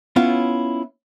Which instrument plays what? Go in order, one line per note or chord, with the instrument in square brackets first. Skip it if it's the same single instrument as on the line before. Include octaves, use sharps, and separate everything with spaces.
[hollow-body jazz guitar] B3 C#4 E4 F4